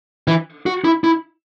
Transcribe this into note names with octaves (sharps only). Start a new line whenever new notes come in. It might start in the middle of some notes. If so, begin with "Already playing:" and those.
E3
F#4
E4
E4